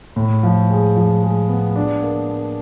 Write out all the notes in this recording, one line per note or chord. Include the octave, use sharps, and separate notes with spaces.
A2
F3
G#3
F3
G#3
B3
D4
A#3
A#3